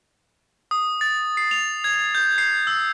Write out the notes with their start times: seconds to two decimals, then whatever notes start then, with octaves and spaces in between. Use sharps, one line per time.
0.71 D#6
1.01 A6
1.37 C7
1.51 F7
1.84 G#6
2.15 G6
2.38 C7
2.67 E6